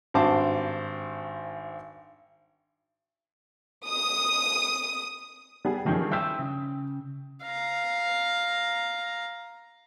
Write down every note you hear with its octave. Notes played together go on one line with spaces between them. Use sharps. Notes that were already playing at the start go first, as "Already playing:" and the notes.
G#1 G2 F#4 C5 A5 D6
D#6
G3 B3 G#4
G2 D#3 F3 C#4 G#4
E4 C5 E5 G5
C#3
F5 A#5